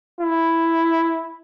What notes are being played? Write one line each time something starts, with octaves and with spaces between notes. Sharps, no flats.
E4